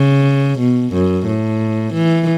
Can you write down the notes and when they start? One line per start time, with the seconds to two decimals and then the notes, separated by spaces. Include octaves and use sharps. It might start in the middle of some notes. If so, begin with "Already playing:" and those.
Already playing: C#3
0.59 B2
0.93 F#2
1.27 A2
1.94 E3